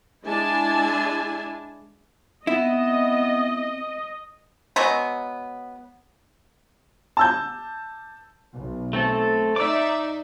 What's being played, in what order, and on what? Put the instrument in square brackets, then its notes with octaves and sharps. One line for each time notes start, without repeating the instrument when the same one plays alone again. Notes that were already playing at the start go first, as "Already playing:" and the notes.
[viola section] G#3 D4 E4 G#5 A5
[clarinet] B3 [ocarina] C4 [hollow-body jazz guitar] E4 [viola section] D#5
[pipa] F#3 G#3 B3
[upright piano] A5 E6 G6
[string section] B1
[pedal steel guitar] A3 C4 A4
[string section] D#4 D5 E5 [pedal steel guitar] D6 E6